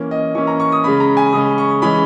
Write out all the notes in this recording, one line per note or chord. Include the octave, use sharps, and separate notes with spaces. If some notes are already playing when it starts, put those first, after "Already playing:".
Already playing: E3 A#3 C#4
D#5
E3 A#3 C#4 C#6
A#5
C#6
D#6
C#3 G#3 C#4 B5
A#5
G#5
C#3 G#3 C#4 D#6
C#6
E3 G#3 C#4 B5